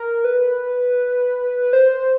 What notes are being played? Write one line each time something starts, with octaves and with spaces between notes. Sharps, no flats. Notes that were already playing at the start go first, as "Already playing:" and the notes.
Already playing: A#4
B4
C5